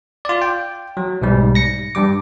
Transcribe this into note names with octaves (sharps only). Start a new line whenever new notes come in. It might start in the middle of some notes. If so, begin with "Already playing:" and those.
F4 D5
G5
F#3
B1 G#2 G3
A#6 C#7
G2 G3 D6